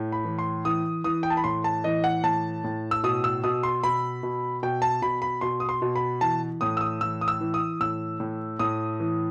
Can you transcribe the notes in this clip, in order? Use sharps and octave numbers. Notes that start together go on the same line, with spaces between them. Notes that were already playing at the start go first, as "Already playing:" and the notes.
Already playing: A2
B5
E3
C6
E3 D#6
E3 D#6
G5
A5
B5
A2 C6
A5
E3 D#5
F#5
A2 A5
A2
E6
B2 D#6
E6
B2 D#6
C6
B2 B5
B2
B2 G5
A5
B2 B5
B5
B2 C6
D#6
C6
B2
B5
E3 A5
A2 D#6
E6
D#6
E3 E6
D#6
E6
E3
D#6
A2 E6
A2
A2 D#6
E3